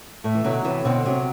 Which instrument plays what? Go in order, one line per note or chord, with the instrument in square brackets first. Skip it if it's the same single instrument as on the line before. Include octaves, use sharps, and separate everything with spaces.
[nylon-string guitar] A2 [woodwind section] A3
[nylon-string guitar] E3
[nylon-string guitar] B2 D3 [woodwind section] F#3
[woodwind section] A2 [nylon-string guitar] C3 E3
[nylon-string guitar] B2 D3 [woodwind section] C4
[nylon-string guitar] C3 [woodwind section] F#3